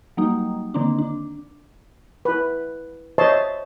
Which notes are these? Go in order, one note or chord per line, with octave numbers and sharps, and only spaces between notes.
F#3 G3 A#3 D#4
D3 D#3 A#3 C4 D4
D4
E4 B4
C5 C#5 D#5 E5 A5 C6